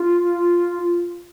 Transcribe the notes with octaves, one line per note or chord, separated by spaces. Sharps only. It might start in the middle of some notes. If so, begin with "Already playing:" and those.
Already playing: F4